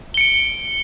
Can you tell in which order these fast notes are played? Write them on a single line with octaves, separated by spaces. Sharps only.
G7 C#7 D7